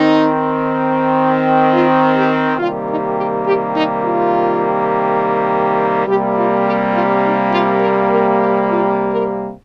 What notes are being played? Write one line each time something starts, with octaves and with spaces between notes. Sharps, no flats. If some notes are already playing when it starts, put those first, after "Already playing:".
Already playing: D#3 C4 D#4
F4
G4
C3 D#3 G3 A#3 F4
D#4
G4
G4
D#4
F4
C3 G3 A#3 G4
F4
G4
F4
D#4
F4
A#4
A#4
G4
F4
A#4